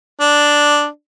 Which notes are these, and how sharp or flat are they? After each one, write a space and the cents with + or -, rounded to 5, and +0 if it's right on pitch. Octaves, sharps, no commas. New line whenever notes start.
D4 +0